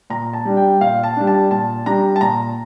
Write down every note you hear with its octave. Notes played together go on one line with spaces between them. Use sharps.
A#2 A#5
A5
G3 D4
G5
A#2 F5
A5
G3 D4
A5
A#2 A5
G3 D4 A#5
A5
A#2 A#5